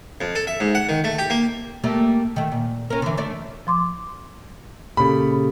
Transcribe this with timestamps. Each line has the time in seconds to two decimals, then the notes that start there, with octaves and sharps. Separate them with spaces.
0.21 F2
0.35 A4
0.47 E5
0.60 G#2
0.75 F#5
0.89 D#3
1.04 A3
1.19 G4
1.30 A#3
1.84 G3 A3 A#3
2.36 D#3 A3
2.52 A#2
2.90 C#4 A#4
3.02 D3 E3
3.18 A3 D4 D5
3.67 F3 C6 D6
4.97 A#2 C#3 G4 A4 B5